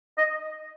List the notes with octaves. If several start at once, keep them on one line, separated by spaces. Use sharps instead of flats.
D#5